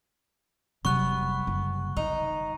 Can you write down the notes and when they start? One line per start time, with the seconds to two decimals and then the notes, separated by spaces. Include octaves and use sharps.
0.85 F1 C3 F#3 G3 B3 C#6 F#6
1.47 F#1
1.97 D#3 D#4